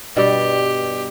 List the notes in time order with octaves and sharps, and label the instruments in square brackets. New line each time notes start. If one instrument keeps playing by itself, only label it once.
[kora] G2 B2 G3 [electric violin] G4